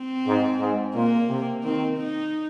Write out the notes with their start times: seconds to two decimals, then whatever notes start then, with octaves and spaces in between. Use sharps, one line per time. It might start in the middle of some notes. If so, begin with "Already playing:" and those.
Already playing: C4
0.26 G#2
0.60 G#2
0.95 A#2 A#3
1.29 C3
1.63 D#3 C4
1.97 D#4